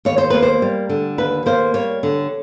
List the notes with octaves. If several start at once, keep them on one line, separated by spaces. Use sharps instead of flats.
D#2 C#5
C5
A#3 B4
C5
G3
D3
D#2 B4
A#3 C5
G3 C#5
D3